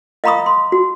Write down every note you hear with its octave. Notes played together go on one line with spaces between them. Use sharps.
D#5 F5 A#5 B5 C#6 D#6
C6
F#4